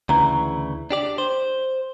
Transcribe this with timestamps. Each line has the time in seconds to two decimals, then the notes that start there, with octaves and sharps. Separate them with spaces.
0.09 D2 C#3 E3 A#5
0.91 D4 G4 D5
1.18 C5